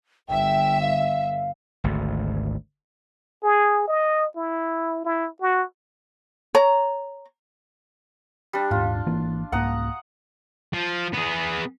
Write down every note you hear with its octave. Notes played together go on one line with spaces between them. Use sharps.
G1 E5 G5
F5
G#1 D2
G#4
D#5
E4
E4
F#4
C#5 A#5
G3 D4
D#1 G#2 F4
G#1 E3 A#3
C2 G#2 A#3 F#5 A#5 D#6
F3
B3 G#4